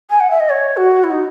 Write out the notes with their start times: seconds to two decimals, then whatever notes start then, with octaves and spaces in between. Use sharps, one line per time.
0.10 G#5
0.20 F#5
0.31 E5
0.40 D#5
0.50 C#5
0.77 F#4
1.04 E4
1.11 D#4